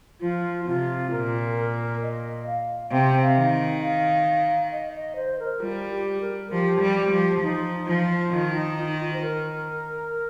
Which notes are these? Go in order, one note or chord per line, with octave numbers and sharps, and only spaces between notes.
F3 F4
C3 F4
A#2 A#4
A#4
D#5
F5
C3 G5
F5
D#3
F5
D#5
D#5
C5
A#4
G3 F4
G4
A#4
F3 G4
G3
F3
F3 D#4
F3 F4
D#3 F4
D#4
F4
F4
C5
A#4